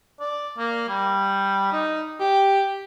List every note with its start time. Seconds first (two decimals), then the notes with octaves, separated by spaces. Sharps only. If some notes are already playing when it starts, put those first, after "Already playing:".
0.20 D5
0.58 A#3
0.89 G3
1.72 D#4
2.20 G4